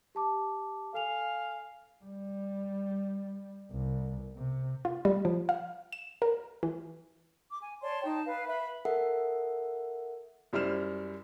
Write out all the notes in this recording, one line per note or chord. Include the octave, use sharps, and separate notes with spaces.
G4 A5 D6
A4 F5 G#5 F7
G3
C2
C3
F4
G3
F3
F5
E7
A#4
E3
D6
G#5
C#5 D5 A5 C6
D#4 G5 A5
B4 F5
B4 E5 B5
A4 A#4 E5 F#5
F#2 G3 E4 C5 F6 E7